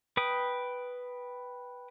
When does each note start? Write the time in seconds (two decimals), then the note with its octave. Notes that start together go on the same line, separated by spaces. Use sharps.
0.17 B4 G5 D#6